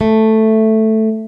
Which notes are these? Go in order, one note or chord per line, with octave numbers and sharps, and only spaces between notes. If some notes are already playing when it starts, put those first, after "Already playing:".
A3